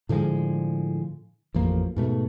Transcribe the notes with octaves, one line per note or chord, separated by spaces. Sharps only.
A2 D3 F3 G#3
A1 F2 F3 A#3
G#2 B2 A3